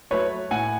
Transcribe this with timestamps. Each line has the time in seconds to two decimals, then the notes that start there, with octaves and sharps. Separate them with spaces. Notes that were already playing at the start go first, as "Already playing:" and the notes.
0.11 F#3 A3 B4 C#5
0.51 A2 F#5 G#5